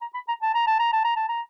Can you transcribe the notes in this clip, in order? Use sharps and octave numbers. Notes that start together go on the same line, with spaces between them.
A#5
B5
A#5
A5
A#5
A5
A#5
A5
A#5
A5
A#5